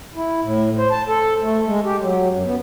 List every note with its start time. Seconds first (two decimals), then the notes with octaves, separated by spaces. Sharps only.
0.15 E4
0.42 A2
0.77 C5
0.91 A5
1.08 A4
1.41 A3
1.65 G#3
1.84 G4
2.00 F#3
2.30 F#2
2.44 B3